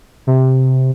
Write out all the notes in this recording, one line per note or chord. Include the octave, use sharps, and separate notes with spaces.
C3